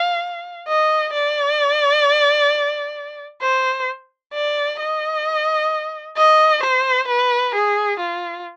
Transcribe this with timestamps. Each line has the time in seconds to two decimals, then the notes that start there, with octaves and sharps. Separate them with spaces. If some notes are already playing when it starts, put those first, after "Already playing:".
Already playing: F5
0.68 D#5
1.14 D5
3.42 C5
4.34 D5
4.80 D#5
6.17 D#5
6.63 C5
7.09 B4
7.55 G#4
8.00 F4